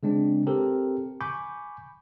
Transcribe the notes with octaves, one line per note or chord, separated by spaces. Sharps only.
C#3 G#3 C4 D4
C4 G4 A4 A#4
G#5 B5 C#6 D6 G6